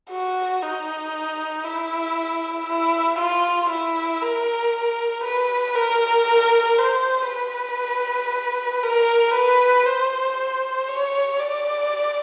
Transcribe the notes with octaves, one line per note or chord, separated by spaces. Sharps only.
F#4
D#4
E4
E4
F4
E4
A#4
B4
A#4
C5
B4
A#4
B4
C5
C#5
D5